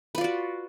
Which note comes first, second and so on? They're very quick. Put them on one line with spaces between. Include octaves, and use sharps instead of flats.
B4 F4 D5 F#4